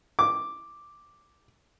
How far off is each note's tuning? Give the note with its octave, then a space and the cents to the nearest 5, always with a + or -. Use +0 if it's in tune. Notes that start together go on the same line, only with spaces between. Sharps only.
D6 +0